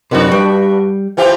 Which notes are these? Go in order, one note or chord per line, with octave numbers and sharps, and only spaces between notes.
F#2 C3 D#3 F3 D4 F#4 B4
G2 G3
E3 F3 B3 G4